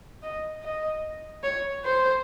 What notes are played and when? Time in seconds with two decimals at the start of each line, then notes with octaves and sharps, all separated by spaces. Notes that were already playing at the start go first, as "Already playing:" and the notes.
0.22 D#5
0.62 D#5
1.43 C#5
1.84 C5